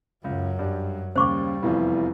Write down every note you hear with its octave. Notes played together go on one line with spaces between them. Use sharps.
C#2 F#2 F#3
G2 G3
D#2 C#3 G3 C5 C#6 D6
F1 E2 E3 F3